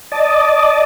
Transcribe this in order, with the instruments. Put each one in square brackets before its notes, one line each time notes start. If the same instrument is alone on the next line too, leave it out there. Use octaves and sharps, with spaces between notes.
[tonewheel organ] D5 D#5 A5